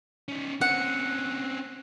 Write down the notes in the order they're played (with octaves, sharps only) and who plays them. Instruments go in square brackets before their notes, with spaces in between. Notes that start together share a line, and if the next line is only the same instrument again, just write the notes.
[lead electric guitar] C#4 D#4
[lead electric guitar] C4 C#4 [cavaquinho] F#5